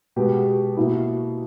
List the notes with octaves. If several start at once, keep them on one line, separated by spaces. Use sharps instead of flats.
B2 G#3 B3 G4 B4
B2 A#3 E4